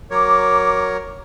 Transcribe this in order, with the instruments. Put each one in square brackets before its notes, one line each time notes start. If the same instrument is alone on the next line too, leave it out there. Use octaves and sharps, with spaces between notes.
[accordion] F#3 A#4 C#5 [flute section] D6